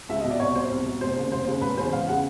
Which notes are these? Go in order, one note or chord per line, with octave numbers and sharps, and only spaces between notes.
C#2 E5
B2 D#5
D5
C2 C#5
B2 C5
C2
B2
F1 C5
D#2 C#3
F1 C5
D#2 C#3
E1 B4
E2 C#3 C5
E1 F5
C#3 F#5